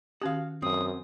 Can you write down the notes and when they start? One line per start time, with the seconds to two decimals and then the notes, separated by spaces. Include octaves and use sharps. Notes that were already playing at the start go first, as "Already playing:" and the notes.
0.22 D#3 C#4 F#4 G4 F5
0.62 F#2 C4 D#6